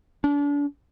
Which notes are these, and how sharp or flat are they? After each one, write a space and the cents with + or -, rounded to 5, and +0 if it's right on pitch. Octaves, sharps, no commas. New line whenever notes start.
D4 -35